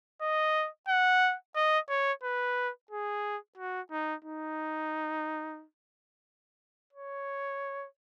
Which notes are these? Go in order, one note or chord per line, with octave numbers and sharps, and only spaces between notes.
D#5
F#5
D#5
C#5
B4
G#4
F#4
D#4
D#4
C#5